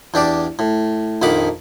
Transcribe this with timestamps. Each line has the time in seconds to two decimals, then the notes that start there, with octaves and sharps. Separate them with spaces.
0.14 E2 D4 G4 D5
0.59 A2
1.22 A#1 F2 D#3 F#5 B5 D6